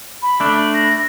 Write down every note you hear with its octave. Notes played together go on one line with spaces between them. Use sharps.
B5
A3 D4
A#6